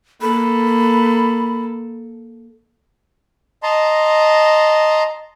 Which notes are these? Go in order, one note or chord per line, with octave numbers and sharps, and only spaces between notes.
A#3 A4 B5
D#5 A5 A#5 C6